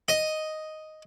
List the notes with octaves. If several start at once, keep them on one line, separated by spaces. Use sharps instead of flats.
D#5